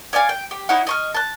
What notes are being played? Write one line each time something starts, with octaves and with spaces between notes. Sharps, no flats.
C#5 D5 F5 G#5
G5
G4
D#4 E4 C#5 F#5
D#5 C#6 F6
A5 F#6